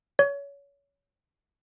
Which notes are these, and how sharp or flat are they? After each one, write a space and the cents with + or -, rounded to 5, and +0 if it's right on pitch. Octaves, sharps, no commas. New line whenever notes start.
C#5 +25